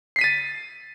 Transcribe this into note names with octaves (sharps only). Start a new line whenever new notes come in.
A6 B6 C7 D#7